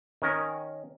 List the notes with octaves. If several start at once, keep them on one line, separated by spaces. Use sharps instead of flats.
D#3 C#4 A#4